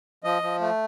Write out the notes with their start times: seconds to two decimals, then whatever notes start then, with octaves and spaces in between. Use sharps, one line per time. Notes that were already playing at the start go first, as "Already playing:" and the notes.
0.24 F3 D#5
0.42 F3
0.61 A3